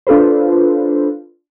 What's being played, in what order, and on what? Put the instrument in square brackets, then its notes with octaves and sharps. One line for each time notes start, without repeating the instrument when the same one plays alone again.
[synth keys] D4 F4 A4 B4 C5